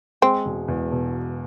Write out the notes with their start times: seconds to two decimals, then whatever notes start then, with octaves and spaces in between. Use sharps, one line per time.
0.22 G#3 C4
0.45 E1
0.68 E2
0.92 B2